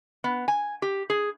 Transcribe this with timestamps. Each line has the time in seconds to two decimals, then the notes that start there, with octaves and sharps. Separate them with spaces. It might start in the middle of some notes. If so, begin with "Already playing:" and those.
0.24 B3
0.48 G#5
0.82 G4
1.10 G#4